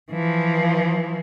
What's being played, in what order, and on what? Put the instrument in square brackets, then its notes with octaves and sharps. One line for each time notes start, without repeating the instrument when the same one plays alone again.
[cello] E3 F3